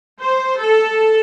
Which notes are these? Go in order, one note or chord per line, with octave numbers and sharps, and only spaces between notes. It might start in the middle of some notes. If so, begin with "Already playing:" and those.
C5
A4